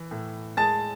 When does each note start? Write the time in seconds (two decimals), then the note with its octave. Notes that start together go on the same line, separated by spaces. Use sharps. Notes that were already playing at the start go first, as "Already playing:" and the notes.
Already playing: E3
0.11 A2
0.57 G#3 A5 A6